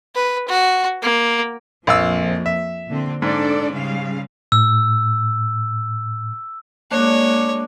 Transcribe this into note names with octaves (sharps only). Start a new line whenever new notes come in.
B4
F#4
A#3
A#1 F2 F3 A#3 F5 E6
E5
A#2 D3 C4
G#2 D4 A4 D5
C#3 G3 F5
A2 E6
G#3 A#3 D4 C#5